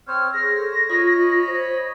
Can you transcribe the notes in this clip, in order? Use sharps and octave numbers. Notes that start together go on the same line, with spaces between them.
C4 C5 C#5 F6
G#4 C5 C#5 A#6
A4
F4 C#5 D#5 B5
C5